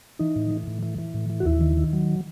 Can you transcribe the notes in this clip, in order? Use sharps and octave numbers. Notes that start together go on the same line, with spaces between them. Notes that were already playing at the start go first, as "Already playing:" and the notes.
E3 D#4
A2
E3
A2
E3
E3
A2
E3
F#4
D#2 E4
D#3
D#3
F#3